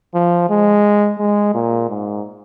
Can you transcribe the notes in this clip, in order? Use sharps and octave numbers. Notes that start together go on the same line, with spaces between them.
F3
G#3
G#3
A#2
G#2